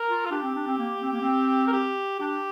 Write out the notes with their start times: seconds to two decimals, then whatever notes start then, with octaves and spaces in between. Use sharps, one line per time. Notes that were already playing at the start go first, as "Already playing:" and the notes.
Already playing: A#4
0.08 F4
0.26 F4
0.31 D4 G4
0.43 C4
0.55 D4
0.67 C4
0.78 A#3
1.02 C4
1.12 A#3
1.22 C4
1.67 A#4
1.72 G4
2.19 D4 G4